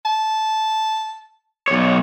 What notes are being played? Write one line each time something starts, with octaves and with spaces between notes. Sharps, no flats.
A5
B1 C#5